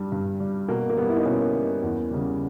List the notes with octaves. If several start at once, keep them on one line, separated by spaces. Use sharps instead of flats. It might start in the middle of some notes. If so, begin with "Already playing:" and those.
Already playing: G2 G3
G2
G3
B2 A#3
A#3
G3 B3
E4
D#4
B2 A#3 C#4
G3
E2
C#3 G3